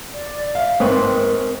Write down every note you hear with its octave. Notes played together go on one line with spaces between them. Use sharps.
D5
E5 F5
G#2 C4 A#4 B4 C#6